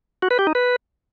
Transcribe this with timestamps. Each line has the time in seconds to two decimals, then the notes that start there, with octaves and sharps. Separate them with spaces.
0.22 F#4
0.31 B4
0.39 G4
0.47 D#4
0.55 B4